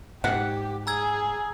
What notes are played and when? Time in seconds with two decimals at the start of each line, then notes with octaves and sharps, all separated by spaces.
0.24 G#2 G4 F#5
0.87 G#4 A#5 E6 G#6